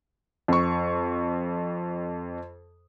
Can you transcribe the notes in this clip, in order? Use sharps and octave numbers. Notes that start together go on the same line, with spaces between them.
F2 C#6